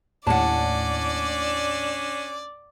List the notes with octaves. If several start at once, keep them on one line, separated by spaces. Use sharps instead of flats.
D#2 A2 C#4 D4 D5 F#5 A5